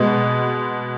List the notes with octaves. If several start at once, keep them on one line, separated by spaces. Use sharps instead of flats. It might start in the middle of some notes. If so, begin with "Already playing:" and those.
Already playing: B2 G#3 B3